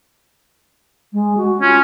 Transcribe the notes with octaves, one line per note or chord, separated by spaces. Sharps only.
G#3
F#4
C#4 F4